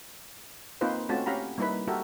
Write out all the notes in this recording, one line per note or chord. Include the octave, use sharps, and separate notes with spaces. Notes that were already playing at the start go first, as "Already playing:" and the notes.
A#3 C4 D#4 F4 B4 C5
A3 C4 C#4 F4 F#4 A5
C#4 G4 F5 F#5 A#5 B5
G3 A#3 D#4 E4 B4 B5
F#4 G4 A4 A#4 E5